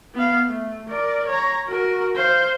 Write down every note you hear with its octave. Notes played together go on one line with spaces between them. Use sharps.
B3 F5
A3
A#4 D5
C#5 A#5
F#4 A#4
C5 F5